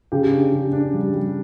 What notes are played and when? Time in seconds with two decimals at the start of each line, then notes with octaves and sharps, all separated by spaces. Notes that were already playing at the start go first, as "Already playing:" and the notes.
0.12 C#3 G4
0.33 D4
0.52 C#3
0.72 D4
0.93 G3
1.13 G3